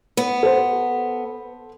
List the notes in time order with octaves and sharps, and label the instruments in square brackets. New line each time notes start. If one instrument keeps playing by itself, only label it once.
[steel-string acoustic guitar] B3
[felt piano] A4 C5